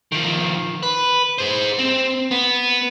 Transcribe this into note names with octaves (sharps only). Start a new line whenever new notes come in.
D#3 F3
B4
G#4 C5
C4
B3